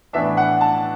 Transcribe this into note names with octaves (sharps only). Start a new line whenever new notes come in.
A2 E3 B3 D4 E5
F#5
A5